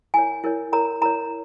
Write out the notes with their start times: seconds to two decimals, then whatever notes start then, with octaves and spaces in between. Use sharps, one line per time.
0.14 E4 A#4 C#5 G#5
0.44 E4 A#4 C#5
0.72 E4 A#4 C#5 A#5
1.01 E4 A#4 C#5 A#5